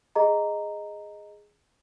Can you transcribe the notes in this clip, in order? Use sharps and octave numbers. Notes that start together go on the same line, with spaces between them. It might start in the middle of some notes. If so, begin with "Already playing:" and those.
G#4 D#5 A#5